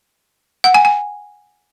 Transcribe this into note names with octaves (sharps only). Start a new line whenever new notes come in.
F#5
G#5
G#5